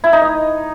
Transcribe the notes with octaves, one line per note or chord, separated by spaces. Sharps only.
E4
D#4
D#5